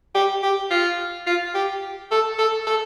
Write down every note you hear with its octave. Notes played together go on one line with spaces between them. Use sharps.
G4
G4
F4
F4
G4
A4
A4
A4